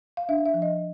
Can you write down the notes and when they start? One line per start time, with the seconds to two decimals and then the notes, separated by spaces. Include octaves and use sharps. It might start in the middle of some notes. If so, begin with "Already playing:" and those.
0.17 F5
0.29 D4 E5
0.46 E5
0.54 F3
0.62 D#5